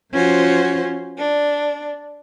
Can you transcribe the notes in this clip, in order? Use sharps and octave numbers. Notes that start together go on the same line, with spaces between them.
F3 C#4 F4 F#4 C5
D4